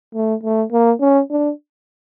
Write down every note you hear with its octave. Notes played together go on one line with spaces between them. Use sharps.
A3
A3
A#3
C#4
D4